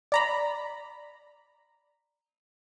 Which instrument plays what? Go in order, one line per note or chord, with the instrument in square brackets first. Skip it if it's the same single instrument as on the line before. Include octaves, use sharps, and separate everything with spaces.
[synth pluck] D5 A#5 B5